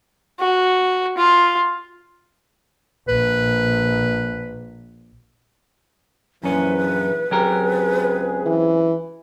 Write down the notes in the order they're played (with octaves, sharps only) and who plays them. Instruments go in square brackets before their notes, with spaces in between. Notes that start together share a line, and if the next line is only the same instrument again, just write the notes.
[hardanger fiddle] F#4
F4
[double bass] A#1 [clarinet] B4
[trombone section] A#1 E3 [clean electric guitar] F#2 C#4 [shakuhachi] B4
[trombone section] C#2 C4 G#4 [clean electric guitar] F#3 G4 A#4
[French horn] E3